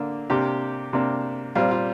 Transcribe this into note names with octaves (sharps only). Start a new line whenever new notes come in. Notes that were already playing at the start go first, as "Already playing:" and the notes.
Already playing: D3 A#3 D4
C3 A#3 D4 G4
C3 A#3 D4
A#2 G3 C4 F4
F4